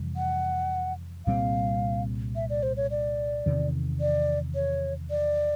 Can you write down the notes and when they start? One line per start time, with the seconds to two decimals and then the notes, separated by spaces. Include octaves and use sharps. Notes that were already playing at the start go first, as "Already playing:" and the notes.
Already playing: F2 C3 E3 G3
0.16 F#5
1.26 C2 A#2 G3 C4 F5
2.36 E5
2.50 D5
2.63 C5
2.77 C#5
2.91 D5
3.46 E2 C3 D#3
4.00 D5
4.55 C#5
5.10 D5